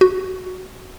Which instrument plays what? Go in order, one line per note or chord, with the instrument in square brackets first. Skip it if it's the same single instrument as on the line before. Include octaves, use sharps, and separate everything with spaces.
[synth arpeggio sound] F#4